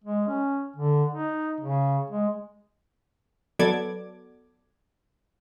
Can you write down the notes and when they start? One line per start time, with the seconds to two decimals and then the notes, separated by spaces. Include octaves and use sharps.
0.04 G#3
0.27 C#4
0.76 D3
1.13 D#4
1.61 C#3
2.11 G#3
3.59 F#3 B3 A4 D5 D6 G#6